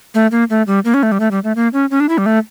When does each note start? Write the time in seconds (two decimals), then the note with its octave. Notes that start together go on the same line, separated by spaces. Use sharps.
0.14 A3
0.32 A#3
0.50 A3
0.67 G3
0.85 A#3
0.94 C#4
1.03 A3
1.12 G3
1.20 A3
1.31 G3
1.44 A3
1.56 A#3
1.73 C#4
1.91 C#4
2.00 D4
2.09 E4
2.18 G3
2.26 A3